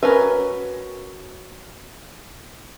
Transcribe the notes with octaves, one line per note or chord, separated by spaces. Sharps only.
C#4 F#4 A#4 B4